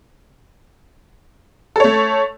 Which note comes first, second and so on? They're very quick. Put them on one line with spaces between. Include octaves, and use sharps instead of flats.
A4 C#5 A3